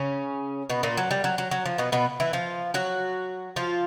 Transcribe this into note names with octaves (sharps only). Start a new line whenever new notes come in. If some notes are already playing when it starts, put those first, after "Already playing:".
Already playing: C#3 C#4
B2 B3
A#2 A#3
F#3
G3
F#3
F#3
F#3
F3
B2 B3
B2 B3
E3 E4
F3 F4
F#3 F#4
F3 F4